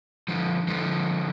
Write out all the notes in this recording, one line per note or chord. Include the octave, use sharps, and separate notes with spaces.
D3 F3
D3 F3